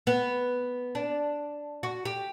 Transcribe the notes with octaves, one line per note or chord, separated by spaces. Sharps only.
B3
D4
F#4
G4